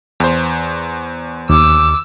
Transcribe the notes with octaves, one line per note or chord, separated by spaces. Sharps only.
E2 C5
D#2 D6 E6